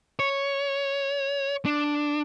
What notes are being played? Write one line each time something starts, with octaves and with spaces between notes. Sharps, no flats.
C#5
D4